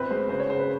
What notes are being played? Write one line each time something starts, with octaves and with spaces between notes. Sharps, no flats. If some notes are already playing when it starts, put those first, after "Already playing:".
Already playing: G1 C4 B4
G#3 C5
C#3 C5
C#5
C#3 C5
B4